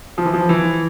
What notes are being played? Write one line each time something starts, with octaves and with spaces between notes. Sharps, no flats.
F3
E3
F3
E3